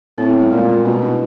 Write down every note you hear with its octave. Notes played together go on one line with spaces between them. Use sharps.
A2 C4
B3
G3
A#2 G#3
A3
B2 C#4 D#4
D4 E4